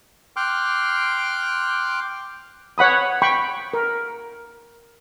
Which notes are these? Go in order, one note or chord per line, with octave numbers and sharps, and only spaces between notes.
G5 C6 D6 F6 F#6
C#5 F#5 B5 D#6
G5 B5 C#6
A#4